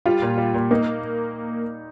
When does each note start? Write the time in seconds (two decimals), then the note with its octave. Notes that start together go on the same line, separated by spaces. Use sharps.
0.06 G3 F4
0.22 A#2
0.38 G3
0.54 A#2
0.71 A#3 D#4